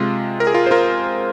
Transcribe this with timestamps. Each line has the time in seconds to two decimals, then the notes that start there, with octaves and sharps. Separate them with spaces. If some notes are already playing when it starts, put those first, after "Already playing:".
Already playing: C3 G#3 F4
0.40 A#4
0.47 G#4
0.54 F4 A#4
0.66 C5
0.71 F4 A#4